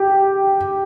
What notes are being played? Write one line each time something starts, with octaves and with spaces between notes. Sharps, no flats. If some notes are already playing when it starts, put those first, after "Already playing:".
Already playing: G4